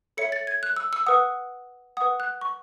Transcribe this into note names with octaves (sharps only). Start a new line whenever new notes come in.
A4 C#5 E5 C#7
A6
G#6
F#6
E6
E6
B4 F#5 D#6
B4 F#5 D#6
F#6
C#6